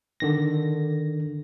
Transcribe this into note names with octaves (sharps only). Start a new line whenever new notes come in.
D3 D#3 A#6